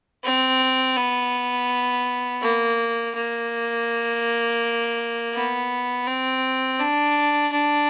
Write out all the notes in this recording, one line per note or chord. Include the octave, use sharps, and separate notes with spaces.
C4
B3
A#3
A#3
B3
C4
D4
D4